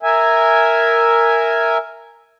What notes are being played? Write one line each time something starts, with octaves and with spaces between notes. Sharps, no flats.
A#4 E5 G#5